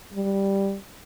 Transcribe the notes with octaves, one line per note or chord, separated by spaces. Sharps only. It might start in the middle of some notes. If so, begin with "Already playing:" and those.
G3